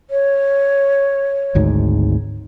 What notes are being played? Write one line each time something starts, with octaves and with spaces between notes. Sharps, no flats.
C#5
G#1 D2 G#2